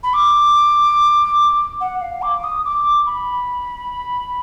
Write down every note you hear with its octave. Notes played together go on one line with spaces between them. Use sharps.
B5
D6
F#5
F5
D6
D#6
D6
B5